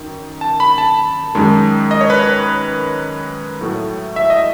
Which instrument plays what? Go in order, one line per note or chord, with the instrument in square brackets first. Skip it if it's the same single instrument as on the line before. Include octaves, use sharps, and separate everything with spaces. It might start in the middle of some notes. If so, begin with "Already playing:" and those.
Already playing: [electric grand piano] F#2 D#3
A5
B5
A5
F#2 D#3 G#3
D#5
C#5
B4
C#5
A2 F#3 A3
E5
D#5